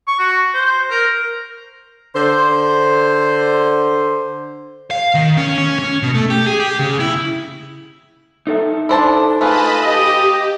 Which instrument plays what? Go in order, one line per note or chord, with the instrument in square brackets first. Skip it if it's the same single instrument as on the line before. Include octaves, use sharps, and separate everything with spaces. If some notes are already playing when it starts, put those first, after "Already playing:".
[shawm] C#6
F#4
C5
A#4
[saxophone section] D3 C5
[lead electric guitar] F5
D#3
C#4
C#4
C#4
B2
A3
G4
G#4
G4
C#3
E4
[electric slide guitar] D#4 A4 E5
[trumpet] D4 [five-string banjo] E4 C5 A5
[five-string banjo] A3 F4 G#4 [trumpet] B4 [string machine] D#5 A5 B5
[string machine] G4 [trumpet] D#5